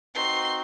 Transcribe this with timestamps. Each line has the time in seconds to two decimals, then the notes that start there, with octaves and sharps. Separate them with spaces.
0.15 C4 D#4 F#4 C6